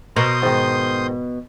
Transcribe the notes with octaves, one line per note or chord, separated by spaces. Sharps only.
B2 A#4 C6 D#6 G6
G#2 D#3